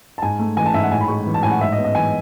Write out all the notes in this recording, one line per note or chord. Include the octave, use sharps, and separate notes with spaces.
A5
G#2 G#5
A3
E3 G#5
A5
G#2 E5
F#5
A2 G#5
B5
G#3 C#6
E3
A5
A2 G#5
F#5
G#2 E5
D#5
B3
D#5
E3 G#5